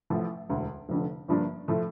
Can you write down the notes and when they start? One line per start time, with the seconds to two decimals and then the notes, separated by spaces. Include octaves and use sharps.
0.10 A1 A2 F3
0.49 E1 D2 D3
0.89 F1 F2 D3
1.28 G1 G2 F3 A#3 D4
1.68 A2 F3 A3